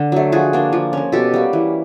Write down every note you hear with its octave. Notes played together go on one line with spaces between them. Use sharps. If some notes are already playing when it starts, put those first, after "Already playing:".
Already playing: D3
F#3 A3
F3 F#4 G#4
A#3 D4
F3
A#3 C#4
B2 G4 A4
G3 A#3
E3